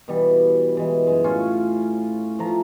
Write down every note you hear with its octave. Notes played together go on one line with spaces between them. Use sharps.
B2 E3 G3
E3 G#3
F#2 G#3
A2 C#4 F4 C#6
F3 A3 A#5